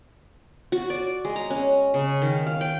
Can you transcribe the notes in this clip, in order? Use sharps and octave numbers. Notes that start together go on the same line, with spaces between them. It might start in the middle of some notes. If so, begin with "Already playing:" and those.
F#4
D5
G#3
A#5
C#4
C#3
D#3
F5
G5